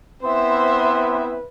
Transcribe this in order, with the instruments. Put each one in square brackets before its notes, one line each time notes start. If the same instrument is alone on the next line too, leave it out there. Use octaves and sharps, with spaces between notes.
[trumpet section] B3 C4 E4 [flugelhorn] B4 [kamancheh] C5 E5 [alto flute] C6